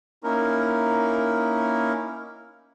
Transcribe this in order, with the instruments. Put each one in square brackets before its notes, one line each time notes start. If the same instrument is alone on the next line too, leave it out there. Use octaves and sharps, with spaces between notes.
[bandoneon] A#3 C#4 D#4 E4 A#4